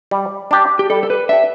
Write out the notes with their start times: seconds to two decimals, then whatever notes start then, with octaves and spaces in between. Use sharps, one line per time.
0.11 G3
0.51 D4 G4
0.79 G4
0.90 G3 A4
1.03 A4
1.10 B4
1.29 D4 G4 E5